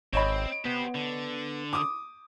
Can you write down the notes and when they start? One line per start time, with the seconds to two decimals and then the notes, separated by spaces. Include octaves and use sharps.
0.13 G#1 C4 C#5 D#5 B5
0.65 B3 G4 C5
0.95 D3
1.73 D6 D#6